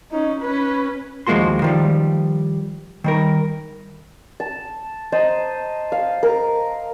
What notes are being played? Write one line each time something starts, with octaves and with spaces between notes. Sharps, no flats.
C#4 D#4
C#4 B4
D#2 F3 G#3 A#3 F#4 C6
D#3 F3 G3
D#3 G3 A#4
A5
C5 D#5 A5 A#5
F5
A#4